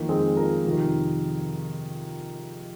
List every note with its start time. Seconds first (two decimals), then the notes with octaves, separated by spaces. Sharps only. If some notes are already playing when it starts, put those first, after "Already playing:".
Already playing: F2 D#3 A#3
0.09 G#3 C4
0.37 F4 A#4
0.65 F2 C3 D#3